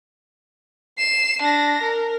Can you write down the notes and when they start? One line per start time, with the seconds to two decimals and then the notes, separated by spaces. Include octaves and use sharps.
0.98 C7 E7
1.42 D4 A#6
1.82 A#4